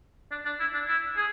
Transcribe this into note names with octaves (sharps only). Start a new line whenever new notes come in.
D4
D4
E4
D4
E4
G#4